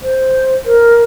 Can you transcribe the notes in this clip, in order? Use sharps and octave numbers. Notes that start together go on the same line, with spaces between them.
C5
A#4